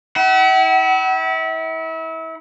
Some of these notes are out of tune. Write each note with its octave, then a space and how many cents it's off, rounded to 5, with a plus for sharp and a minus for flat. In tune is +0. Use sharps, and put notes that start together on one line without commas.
E4 -30 F#5 +40